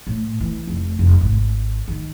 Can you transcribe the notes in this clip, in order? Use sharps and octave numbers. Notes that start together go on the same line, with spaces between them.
A2
E3
F1
F1
G#1
D#3